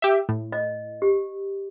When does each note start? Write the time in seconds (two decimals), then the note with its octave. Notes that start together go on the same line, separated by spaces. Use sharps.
0.02 G4 E5
0.29 A2
0.52 D#5
1.02 G4